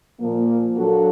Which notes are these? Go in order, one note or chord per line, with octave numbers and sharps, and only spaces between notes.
A#2 F3 A#3
F#3 A#3 D4 F#4 A4